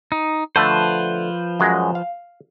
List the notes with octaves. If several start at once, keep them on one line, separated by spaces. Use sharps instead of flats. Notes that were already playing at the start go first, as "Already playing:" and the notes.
D#4
D3 F3 A3 B4 C5
F#2 F#3 G#3
F5